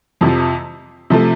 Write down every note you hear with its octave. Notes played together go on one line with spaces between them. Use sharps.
F2 C3 F3
C3 F3 A3